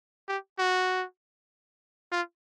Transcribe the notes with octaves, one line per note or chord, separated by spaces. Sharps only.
G4
F#4
F4